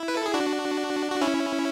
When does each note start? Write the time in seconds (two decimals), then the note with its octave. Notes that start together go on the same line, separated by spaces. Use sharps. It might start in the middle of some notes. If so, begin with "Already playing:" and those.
Already playing: E4
0.08 B4
0.17 A4
0.26 G#4
0.34 D4 F#4
1.10 F#4
1.21 C#4 E4